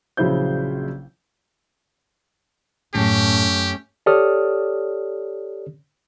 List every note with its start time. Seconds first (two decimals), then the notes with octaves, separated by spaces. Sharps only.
0.17 A#1 C#3 F#3 E4 C5 G6
2.94 F#2 A2 A3 C#4 G4
4.06 G4 A4 C#5 D5 D#6 F6